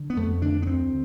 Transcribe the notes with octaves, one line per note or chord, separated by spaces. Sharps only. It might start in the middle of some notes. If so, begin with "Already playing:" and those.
Already playing: D3
B3
F2 A3
D3 D4
B3
D2 C4